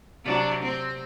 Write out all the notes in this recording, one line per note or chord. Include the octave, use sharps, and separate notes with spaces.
C3 F#3 D4
C4